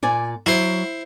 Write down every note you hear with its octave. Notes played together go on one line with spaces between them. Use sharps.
A#2 D5 G#5
F#3 E4 C5